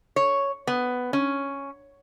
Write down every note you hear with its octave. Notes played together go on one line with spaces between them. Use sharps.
C#5
B3
C#4